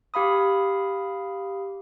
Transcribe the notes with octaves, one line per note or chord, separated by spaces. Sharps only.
G4 F5 B5 D#6